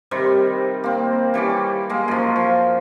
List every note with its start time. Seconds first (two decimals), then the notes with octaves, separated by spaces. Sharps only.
0.11 C3 D#3 G3 C4
0.84 A#3 C4
1.34 E3 G3 C#4 D6
1.90 G#3 A#3
2.08 F#2 F3
2.36 F3